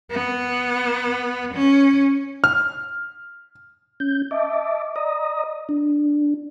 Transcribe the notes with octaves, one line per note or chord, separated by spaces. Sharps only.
B3
C#4
F6
C#4 G6
D#5 E5 A5 D6
D5 D#5 A#5 D#6
D4